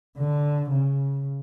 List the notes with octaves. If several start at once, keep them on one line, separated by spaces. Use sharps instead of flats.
D3
C#3